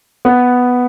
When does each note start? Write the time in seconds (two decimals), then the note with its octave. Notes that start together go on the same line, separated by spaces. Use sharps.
0.25 B3